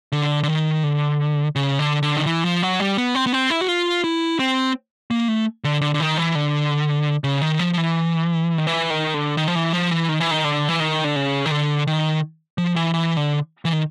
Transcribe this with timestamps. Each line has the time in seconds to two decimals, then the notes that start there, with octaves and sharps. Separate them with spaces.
0.12 D3
0.43 D3
0.48 D#3
0.83 D3
1.56 C#3
1.79 D3
2.03 D3
2.17 D#3
2.26 E3
2.44 F3
2.62 F#3
2.80 G3
2.97 B3
3.15 C4
3.27 B3
3.33 C4
3.50 E4
3.61 F#4
3.68 F4
4.04 E4
4.39 C4
5.11 A#3
5.28 A3
5.64 D3
5.81 D3
5.94 D3
6.00 D#3
6.18 E3
6.35 D3
7.24 C#3
7.42 D#3
7.59 F3
7.73 F3
7.78 E3
8.58 D#3
8.67 E3
8.90 D#3
9.14 D3
9.37 D#3
9.48 F3
9.56 E3
9.73 F3
9.91 E3
10.09 D#3
10.20 E3
10.31 D#3
10.44 D3
10.69 E3
10.80 D#3
11.04 D3
11.16 C#3
11.46 D#3
11.51 D3
11.87 D#3
12.58 F3
12.76 E3
12.94 E3
13.17 D3
13.65 E3
13.73 D#3